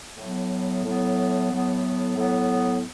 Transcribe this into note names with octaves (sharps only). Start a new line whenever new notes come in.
A2 F#3 B3
A2 F#3 B3
A2 F#3 B3
A2 F#3 B3